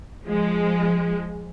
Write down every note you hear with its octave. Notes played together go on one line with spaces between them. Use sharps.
F3 G#3